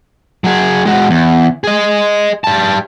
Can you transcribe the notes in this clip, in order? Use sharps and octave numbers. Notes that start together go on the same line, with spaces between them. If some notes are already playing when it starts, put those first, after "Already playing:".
F#3 G#4
G#3 F#4
E2
G#4 D#5
G3 A5